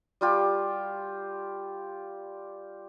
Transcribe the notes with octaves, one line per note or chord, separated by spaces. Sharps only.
G3 F4 G4